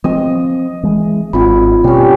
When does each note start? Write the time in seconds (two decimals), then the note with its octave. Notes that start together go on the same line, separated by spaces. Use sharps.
0.04 F3 C4 D#5
0.83 E3 G#3
1.33 G#1 C4 F4 B5
1.84 B2 G3 A#3 C#4